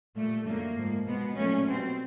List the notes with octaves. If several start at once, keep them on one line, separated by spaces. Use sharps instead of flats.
A#2 G3 A3
F#2 D3 F3 A3 A#3
G#2 F3 G#3
B2 G#3 B3
A#2 F#3 A3 C#4
B2 G3 C4